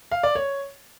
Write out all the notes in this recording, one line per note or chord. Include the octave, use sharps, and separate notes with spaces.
F5
D5
C#5